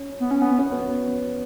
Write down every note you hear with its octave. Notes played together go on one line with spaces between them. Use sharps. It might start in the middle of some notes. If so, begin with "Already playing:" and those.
Already playing: C#4
B3
C#4
B3
C#4
B3